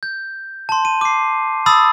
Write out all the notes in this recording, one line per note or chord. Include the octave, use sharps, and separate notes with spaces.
G6
A5 C6
D#7
D6 C7
A5 B5 D#6 E6 A6